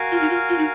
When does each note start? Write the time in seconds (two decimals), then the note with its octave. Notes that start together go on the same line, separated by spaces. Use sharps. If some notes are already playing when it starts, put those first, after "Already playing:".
Already playing: F#4 A#4 F5 G#5
0.11 F4
0.21 D#4
0.30 F4
0.49 F4
0.58 D#4